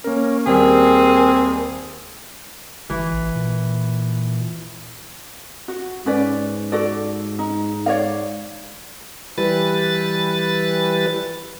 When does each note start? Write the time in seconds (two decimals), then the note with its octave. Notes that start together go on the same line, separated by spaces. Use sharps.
0.04 A#3 C#4 A#4
0.47 D#2 G3 C4 G#4 A#4
2.90 G1 E3
3.13 A1
3.35 A#2
5.68 F#4
6.06 G#2 C#4 B4 D5
6.72 F#4 A4 D5
7.39 D#4
7.86 C#5 D5 F5
9.38 E3 G3 B4 A6